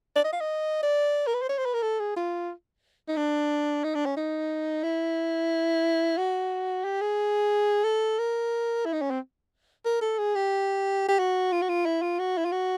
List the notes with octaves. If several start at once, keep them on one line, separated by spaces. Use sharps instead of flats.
D5
D#5
F5
D#5
D5
A#4
B4
C5
C#5
C5
B4
A#4
A4
G#4
F4
D#4
D4
D#4
D4
C#4
D#4
E4
F#4
G4
G#4
A4
A#4
E4
D#4
C#4
C4
A#4
A4
G#4
G4
G4
F#4
F4
F#4
F4
E4
F4
F#4
E4
F4
F#4